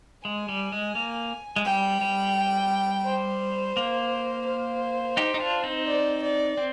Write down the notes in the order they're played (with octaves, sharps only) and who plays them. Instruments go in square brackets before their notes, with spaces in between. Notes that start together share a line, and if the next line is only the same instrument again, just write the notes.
[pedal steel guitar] G#3 [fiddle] G#5
[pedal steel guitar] G3
G#3
A#3
G#3
[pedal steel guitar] G3 [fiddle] G5
[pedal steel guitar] G3
[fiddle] C5
[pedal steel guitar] A#3
[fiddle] C5
[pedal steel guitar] D#4 G4
D#4
D4 F4
C4 D#4
[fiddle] D5
D5
[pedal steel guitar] C4